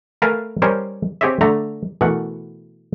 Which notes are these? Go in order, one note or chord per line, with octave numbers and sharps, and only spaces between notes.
A3 A#4 B4 F5 G#5 A5
G3 C#4 A#4 C5 C#5 D#5
C4 G4 G#4 C#5 D#5 E5
D3 A3 A#5
B2 E3 A3 A#4 F#5